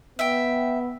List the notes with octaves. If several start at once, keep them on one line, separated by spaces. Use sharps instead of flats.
B3 E5 G5